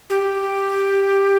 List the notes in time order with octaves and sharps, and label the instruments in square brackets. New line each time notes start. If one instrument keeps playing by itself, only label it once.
[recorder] G4